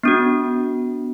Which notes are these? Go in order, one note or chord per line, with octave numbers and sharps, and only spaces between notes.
B3 D4 F#4